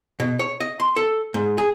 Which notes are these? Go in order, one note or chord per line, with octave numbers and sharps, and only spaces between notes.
B2
C#5
D#5
C6
A4
G#2
G#4